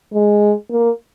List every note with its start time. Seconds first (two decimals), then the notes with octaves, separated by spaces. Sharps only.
0.14 G#3
0.70 A#3